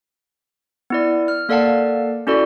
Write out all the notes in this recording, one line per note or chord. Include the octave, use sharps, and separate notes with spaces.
B3 E4 D5
F6
A#3 A4 D5 F5 F#5 A5
C#4 E4 F#4 A4 D5